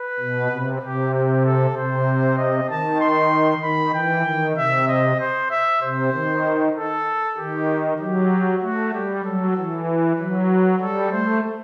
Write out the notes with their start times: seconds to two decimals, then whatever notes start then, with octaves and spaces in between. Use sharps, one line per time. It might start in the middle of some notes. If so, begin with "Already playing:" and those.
Already playing: B4
0.20 B2
0.51 C3
0.82 C3 G4
1.14 G4
1.45 A4
1.76 C3 C5
2.38 D#5
2.70 D#3 A5
3.01 C6
3.63 D#3 B5
3.94 E3 G5
4.25 D#3
4.57 C3 E5
4.88 D#5
5.19 C5
5.50 E5
5.81 C3 C5
6.13 D#3
6.75 A4
7.37 D#3 G4
7.99 F#3 G4
8.62 A3 F#4
8.94 G3 G4
9.25 F#3 A4
9.56 E3
9.88 B4
10.19 F#3
10.80 G3 A4
11.12 A3 C5